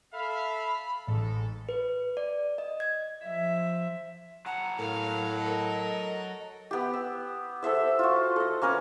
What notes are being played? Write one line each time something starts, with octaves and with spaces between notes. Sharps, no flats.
A4 E5 F5 B5
A1 G#2 A4
B4
D5
D#5
G#6
F3 E5
F#3 F#5 A5 A#5
A2 A#4 F5
A4 A#4 D#5
B3 G4
E6
A4 C5 E5 E6
F4 F#4
A4 D#5
A#3 C#4 A#4 B4